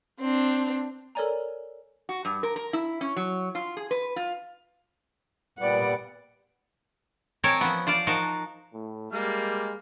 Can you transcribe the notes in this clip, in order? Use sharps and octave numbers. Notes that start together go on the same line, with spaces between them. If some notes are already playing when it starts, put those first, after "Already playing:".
C4 D4
A4 A#4 C#5 D5 G#5 A#5
F#4
G2
A#4
A#4
E4
C#4
F#3
F4
G#4
B4
F4
A#2 G3 B3 D5 F#5
C4 A#4 C#5 D#5 G#5 A5
F3 B3
F4 C5 D5 F5
F3 D#4 F#4 A#4 A5
A2
G3 G#3 A#3 F6